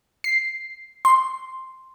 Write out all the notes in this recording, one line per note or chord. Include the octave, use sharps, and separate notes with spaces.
C7
C6